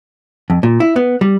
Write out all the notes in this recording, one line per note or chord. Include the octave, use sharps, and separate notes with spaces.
F2
A#2
E4
B3
G3